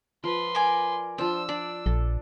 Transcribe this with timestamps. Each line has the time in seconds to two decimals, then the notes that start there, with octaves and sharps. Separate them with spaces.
0.24 F3 B4 C6
0.55 A#4 D5 G#5
1.18 F3 D4 C5 E6
1.49 D4 D5
1.86 A#1 A4